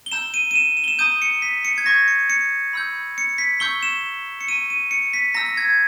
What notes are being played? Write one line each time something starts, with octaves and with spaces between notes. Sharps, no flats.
G7
A#5 E6 G6 E7
D#7
D#7
E7
E7
G7
E7
A#5 D#6 G6 D#7
C#7
B6
C#7
G#6
A#5 C#6 G6 A#6
C#7
C#7
B5 E6 G6
C#7
B6
A#5 C#6 E6 G6 G7
E7
C#7
A#5 C#6 E6 D#7
D#7
C#7
B6
A#5 E6 G6 A#6
A#6
G#6